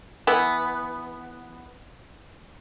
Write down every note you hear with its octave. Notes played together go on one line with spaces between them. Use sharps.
E3 B3